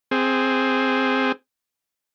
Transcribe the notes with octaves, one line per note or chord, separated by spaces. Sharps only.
C4 G#4